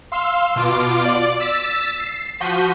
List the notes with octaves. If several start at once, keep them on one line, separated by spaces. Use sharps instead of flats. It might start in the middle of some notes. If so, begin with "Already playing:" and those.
F5 C6 E6
B2 F4 D6
D5
E6 A6 B6
C7
F3 F#4 G6 B6 D#7